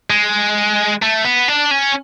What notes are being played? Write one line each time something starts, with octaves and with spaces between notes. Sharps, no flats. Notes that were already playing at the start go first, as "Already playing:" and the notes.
G#3
A3
B3
D4
C#4